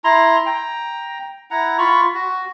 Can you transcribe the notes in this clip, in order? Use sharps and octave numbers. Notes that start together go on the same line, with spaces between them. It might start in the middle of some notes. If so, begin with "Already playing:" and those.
E4 A#5 C6
G5 A#5
E4 F#5 A#5
F4 B5 C#6
F#4